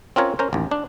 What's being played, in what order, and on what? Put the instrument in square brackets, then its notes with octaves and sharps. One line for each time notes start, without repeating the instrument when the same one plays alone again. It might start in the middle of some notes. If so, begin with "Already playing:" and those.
[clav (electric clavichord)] C4 C#4 F4 A#4 C#5
C#4 A#4 C5
A1 D#2
D4